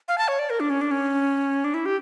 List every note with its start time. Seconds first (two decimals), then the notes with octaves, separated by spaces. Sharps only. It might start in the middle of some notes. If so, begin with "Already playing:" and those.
0.08 F5
0.18 A5
0.28 C#5
0.39 D5
0.50 A#4
0.60 D4
0.70 C#4
0.81 D4
0.91 C#4
1.64 D4
1.74 E4
1.86 G4